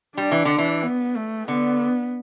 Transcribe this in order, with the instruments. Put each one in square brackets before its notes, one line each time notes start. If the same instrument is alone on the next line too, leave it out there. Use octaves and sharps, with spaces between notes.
[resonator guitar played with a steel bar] G3 [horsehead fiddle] D4
[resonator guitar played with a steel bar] E3
D3
E3
[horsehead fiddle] B3
A3
[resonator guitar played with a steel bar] D3 [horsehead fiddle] B3